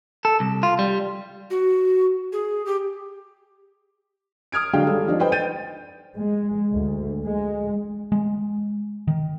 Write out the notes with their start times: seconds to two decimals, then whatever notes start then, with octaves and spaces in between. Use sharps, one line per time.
0.25 A4
0.40 C2
0.63 F4
0.79 G3
1.50 F#4
2.33 G#4
2.66 G4
4.52 D#6 F6 G#6 D7
4.73 D3 F#3 G#3 D4 F5 G5
4.87 G3 A4
5.07 F3 D4 D#4
5.20 B4 C5 D5 D#5 G5
5.32 G5 G6 A6 D#7
6.17 G#3
6.71 D2
7.25 G#3
8.12 G#3
9.08 D#3